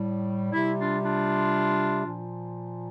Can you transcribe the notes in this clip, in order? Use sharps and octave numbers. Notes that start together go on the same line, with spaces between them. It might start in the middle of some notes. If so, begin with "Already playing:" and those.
Already playing: A2 G3
C3 G3 E4
D4 F4
D4 F4
A#2 F3